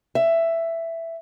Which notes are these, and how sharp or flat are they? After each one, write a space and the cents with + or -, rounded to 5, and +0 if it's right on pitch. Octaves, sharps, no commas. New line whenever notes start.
E5 +10